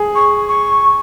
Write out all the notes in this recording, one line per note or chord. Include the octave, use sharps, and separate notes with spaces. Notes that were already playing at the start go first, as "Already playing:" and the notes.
Already playing: G#4
C#6
C#6